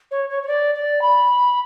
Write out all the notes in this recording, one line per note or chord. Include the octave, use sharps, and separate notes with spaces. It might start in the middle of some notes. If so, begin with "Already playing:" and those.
C#5
C#5
C#5
D5
D5
B5